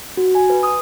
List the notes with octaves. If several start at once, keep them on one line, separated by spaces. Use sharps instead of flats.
F#4
G#5
B4
D#6